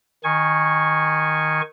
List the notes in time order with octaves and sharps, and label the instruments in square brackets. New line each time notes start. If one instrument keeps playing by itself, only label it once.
[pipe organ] D#3 G#5 C#6